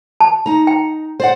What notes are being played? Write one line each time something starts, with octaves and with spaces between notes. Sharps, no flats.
A5
D#4 A#5
G5
C5 D5 F#5